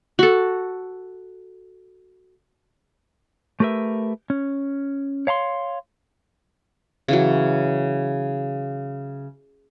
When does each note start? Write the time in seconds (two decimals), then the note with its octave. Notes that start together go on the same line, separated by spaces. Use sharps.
0.19 F#4 A4
3.60 A3 G4 A#4 B4 E5
4.30 C#4
5.27 C#5 F5 A#5 C6
7.08 C#3 E3 F#3